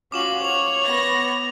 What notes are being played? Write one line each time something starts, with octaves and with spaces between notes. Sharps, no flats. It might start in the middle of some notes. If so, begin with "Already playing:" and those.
C#4 F4 F#4 D6 E7 F#7
C#5 F7
B3 A#6